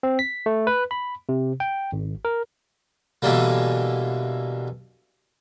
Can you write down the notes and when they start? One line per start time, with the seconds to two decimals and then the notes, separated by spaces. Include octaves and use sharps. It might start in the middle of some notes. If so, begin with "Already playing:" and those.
0.03 C4
0.19 B6
0.46 A3
0.67 B4
0.91 B5
1.29 C3
1.60 G5
1.92 G#1
2.25 A#4
3.22 B2 D3 E3 G3 A#3